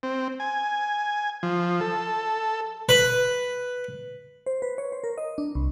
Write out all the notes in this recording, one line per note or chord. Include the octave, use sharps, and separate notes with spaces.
C4
G#5
F3
A4
B4
C5
B4
C#5
C5
A#4
D#5
D4
C2